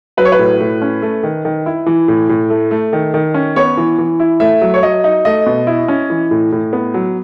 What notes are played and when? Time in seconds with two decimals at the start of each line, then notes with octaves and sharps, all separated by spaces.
0.17 F#3 B4
0.25 C#5
0.32 B4
0.39 A2
0.60 A2
0.82 C#4
1.02 A3
1.23 D#3
1.45 D#3
1.66 E4
1.86 E3
2.08 A2
2.29 A2
2.50 A3
2.71 A3
2.93 D#3
3.14 D#3
3.34 C#4
3.56 B3 C#5
3.77 E3
3.98 E3
4.20 E4
4.40 A3 E5
4.61 F#3
4.74 C#5
4.83 F#3 D#5
5.04 D#4
5.25 A3 D#5
5.46 B2
5.67 E4
5.88 C#4
6.10 E3
6.31 A2
6.52 A2
6.73 B3
6.94 F#3